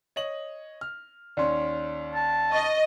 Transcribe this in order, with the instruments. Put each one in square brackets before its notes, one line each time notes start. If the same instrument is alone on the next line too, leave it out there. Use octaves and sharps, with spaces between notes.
[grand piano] C#5 D#5 F#7
F6
[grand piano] D#2 C#4 [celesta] D5 C6
[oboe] A5
[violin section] D#5 [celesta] C#6 A6